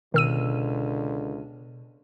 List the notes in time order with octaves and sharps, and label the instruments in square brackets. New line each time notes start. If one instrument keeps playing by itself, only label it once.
[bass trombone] C#2 [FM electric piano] B2 [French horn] D3 [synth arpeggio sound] D#3 E6 D#7